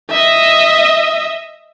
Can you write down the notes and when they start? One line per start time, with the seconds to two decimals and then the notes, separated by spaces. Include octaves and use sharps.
0.10 D#5 E5